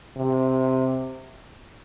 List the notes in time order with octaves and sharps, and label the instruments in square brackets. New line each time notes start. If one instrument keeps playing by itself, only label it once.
[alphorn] C3